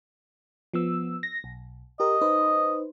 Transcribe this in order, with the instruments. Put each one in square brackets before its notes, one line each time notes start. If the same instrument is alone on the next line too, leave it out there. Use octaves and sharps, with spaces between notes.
[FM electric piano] F3 B3 E6
A#6
B1
[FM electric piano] G4 A#4 [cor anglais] D#5
[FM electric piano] D#4 B4 C5